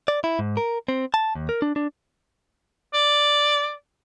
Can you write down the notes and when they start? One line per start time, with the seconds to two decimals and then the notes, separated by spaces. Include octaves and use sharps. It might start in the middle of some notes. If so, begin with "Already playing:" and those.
0.08 D5
0.24 E4
0.39 G#2
0.57 A#4
0.88 C4
1.14 A5
1.35 D#2
1.49 A#4
1.62 D4
1.76 D4
2.94 D5